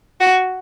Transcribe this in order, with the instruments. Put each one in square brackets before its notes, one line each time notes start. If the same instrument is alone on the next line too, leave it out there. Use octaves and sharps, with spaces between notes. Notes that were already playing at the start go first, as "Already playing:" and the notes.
[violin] F#4